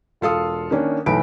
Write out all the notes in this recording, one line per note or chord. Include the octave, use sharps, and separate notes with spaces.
E1 F4 A4 F5 D#6
D#3 A#3 C#4 D4
B1 E3 A3 B5 D7